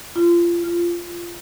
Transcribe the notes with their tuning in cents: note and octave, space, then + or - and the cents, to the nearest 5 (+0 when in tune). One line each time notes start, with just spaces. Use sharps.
F4 -25
F4 -10